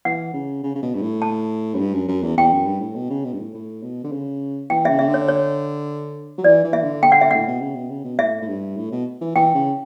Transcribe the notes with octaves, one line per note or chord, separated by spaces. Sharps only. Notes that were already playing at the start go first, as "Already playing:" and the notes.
E3 F#5
C#3
C#3
C#3
B2
G2
A2
A5
F#2
G2
F#2
F#2
E2
E2 G5
F#2
G2
A2
B2
C#3
B2
G2
A2
A2
B2
D3
C#3
E3 G5
C#3 E5
C#3 E5
D3
C#5
C#5
F#3
E3 D5
E3
E5
D3
G5
F#5
E5
A2 F#5
B2
C#3
B2
C#3
B2
A2 E5
A2
G2
A2
B2
E3
E3 G5
C#3